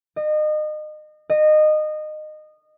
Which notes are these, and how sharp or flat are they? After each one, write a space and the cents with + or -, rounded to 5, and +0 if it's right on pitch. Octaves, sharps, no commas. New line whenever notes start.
D#5 -30
D#5 -20